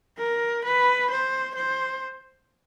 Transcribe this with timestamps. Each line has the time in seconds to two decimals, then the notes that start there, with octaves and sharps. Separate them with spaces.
0.18 A#4
0.65 B4
1.10 C5
1.55 C5